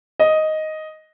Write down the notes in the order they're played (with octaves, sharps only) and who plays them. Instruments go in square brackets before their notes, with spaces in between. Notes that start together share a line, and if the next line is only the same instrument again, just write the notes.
[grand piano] D#5